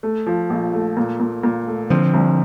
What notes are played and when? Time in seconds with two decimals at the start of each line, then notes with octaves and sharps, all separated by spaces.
0.03 A3
0.26 F3
0.50 A#1
0.73 A3
0.97 A#2
1.20 A#2
1.43 A#2
1.67 A3
1.90 D3 F3 C4
2.14 C2